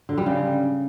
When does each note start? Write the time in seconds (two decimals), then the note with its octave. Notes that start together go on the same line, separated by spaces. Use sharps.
0.09 D3
0.18 G3
0.26 C#3